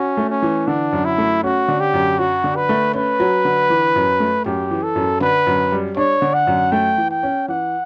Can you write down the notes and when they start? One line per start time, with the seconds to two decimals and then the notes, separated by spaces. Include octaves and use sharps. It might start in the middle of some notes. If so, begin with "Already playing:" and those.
Already playing: C#4 F#4
0.17 A3
0.30 C#4
0.42 E3
0.67 D3 D4
0.93 F#2
1.05 E4
1.18 A3
1.43 C#4 F#4
1.68 D3
1.80 G4
1.94 F#2
2.19 F#3 F#4
2.44 D3
2.56 B4
2.69 A3
2.94 C#4 B4
3.20 F#3
3.45 D3
3.70 E3
3.96 F#2
4.20 A3
4.45 F#2 G4
4.71 E3
4.83 A4
4.96 F#2
5.21 D3 B4
5.47 F#2
5.72 G3
5.97 D4 C#5
6.22 D3
6.34 F#5
6.47 F#2
6.72 A3 G5
6.98 E3
7.11 G5
7.23 C#4
7.48 E3 F#5